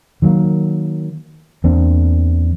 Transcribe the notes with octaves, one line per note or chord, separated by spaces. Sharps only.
D#3 F#3 G#3 A#3
E2 A#3 C4 D4